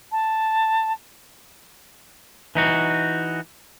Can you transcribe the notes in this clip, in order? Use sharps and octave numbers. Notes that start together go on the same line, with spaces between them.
A5
E3 D#4 F#4